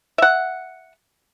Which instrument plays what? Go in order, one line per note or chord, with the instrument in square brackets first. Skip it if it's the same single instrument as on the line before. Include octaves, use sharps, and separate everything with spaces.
[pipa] E5 F#5